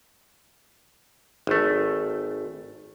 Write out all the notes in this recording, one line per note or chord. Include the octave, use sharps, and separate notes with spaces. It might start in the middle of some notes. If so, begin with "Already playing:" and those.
G#1 A3